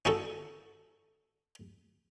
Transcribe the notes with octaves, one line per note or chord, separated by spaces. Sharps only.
C#4 D#4 F#4 A4